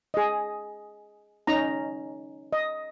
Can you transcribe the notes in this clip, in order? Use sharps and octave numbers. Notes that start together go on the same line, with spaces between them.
G#4 D#5
C#4 D#4 A#5
D#5